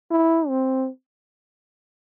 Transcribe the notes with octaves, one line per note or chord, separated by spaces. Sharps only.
E4
C4